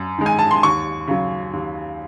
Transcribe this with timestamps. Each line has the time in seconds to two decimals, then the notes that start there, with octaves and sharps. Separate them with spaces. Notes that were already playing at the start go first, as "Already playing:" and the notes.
Already playing: F#2
0.18 D#3 G#3
0.26 G#5
0.39 A5
0.51 C6
0.63 D#2 C#6
1.08 C#3 F#3
1.53 D#2